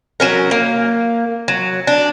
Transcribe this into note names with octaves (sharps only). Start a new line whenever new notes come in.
F#3 C#4 A#4
A#3
F#3
D4